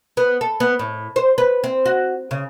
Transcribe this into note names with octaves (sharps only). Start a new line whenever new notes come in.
B3
A4
B3
A2
C5
B4
C4
F#4
C#3